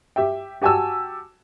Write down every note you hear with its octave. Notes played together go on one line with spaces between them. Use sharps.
G4 E5 G5
F#4 G4 G#5 A5 E6